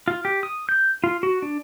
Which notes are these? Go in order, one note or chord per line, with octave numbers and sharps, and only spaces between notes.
F4
G4
D#6
G6
F4
F#4
D4